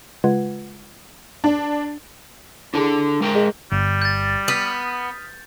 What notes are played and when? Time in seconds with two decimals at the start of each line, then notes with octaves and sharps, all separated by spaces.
0.24 C#3 G#3 F4 B4 F#5 G#6
1.44 D4
2.74 D4 E4 G#4 A4 A5
3.20 G#3 A#4 G5
3.35 G#4 D#5
3.72 G1 G3
4.02 G6 A6
4.48 B3 D#6 F6 B6